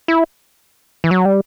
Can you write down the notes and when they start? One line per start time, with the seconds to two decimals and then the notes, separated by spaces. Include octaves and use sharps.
0.08 E4
1.04 E3
1.11 F#3
1.25 G3